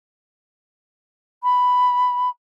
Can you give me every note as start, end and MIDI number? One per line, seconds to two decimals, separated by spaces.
1.43 2.29 83